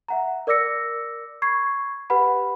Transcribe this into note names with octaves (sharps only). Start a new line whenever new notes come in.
E5 F#5 A#5
A#4 D5 D6 E6 A#6 C#7
B5 C#6 G#6 C7
G4 B4 F#5 B5